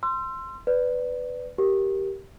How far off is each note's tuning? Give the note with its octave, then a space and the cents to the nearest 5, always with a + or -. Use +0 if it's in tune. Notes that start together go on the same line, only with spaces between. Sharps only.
C6 +0 E6 +40
B4 +15 D5 +0
G4 -10 A#4 +5